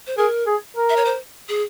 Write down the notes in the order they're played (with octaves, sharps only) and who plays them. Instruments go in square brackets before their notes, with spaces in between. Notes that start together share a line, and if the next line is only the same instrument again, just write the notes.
[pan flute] C5
[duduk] G#4 [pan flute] A#4
[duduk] G#4
A#4
[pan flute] E5
C#5
C5
G#4